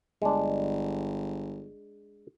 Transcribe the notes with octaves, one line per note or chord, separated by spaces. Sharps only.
G1 G#3 D4